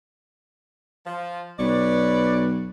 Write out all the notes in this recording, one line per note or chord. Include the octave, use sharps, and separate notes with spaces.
F3
B1 B4 C#5 D5